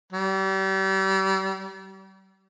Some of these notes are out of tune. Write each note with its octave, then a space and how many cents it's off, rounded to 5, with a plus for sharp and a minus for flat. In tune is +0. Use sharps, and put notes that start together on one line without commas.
G3 -35